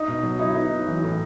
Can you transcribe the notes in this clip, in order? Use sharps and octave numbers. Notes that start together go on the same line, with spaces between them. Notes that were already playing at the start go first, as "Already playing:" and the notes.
Already playing: D#4
B2
F#3
D#4 E4
B3 D#4
F#3
E3
A2